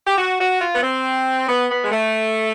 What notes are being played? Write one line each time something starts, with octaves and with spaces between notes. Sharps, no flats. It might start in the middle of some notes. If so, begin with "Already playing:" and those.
G4
F#4
F#4
F4
B3
C4
B3
B3
G#3
A3